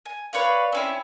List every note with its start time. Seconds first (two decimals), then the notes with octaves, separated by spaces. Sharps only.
0.06 G#5
0.33 B4 C#5 D5 F5
0.72 C4 C#4 E4